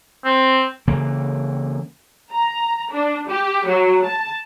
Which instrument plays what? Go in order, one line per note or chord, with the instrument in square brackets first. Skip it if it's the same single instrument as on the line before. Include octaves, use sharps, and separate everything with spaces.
[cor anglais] C4
[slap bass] C#3 E3 A#3
[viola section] A#5
D4
G4
F#3
A5